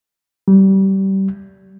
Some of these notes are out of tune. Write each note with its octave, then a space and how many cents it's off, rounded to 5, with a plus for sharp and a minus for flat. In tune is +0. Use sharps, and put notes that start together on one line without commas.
G3 -25